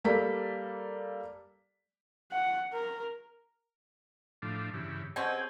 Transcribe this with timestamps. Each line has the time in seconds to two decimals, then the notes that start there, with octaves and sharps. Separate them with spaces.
0.04 G3 A#3 A4 D5 B6
2.32 F#5
2.73 A#4
4.42 A2 F3 D4
4.74 G2 C#3 E3
5.16 B2 C4 C#4 G4 G#4 G#5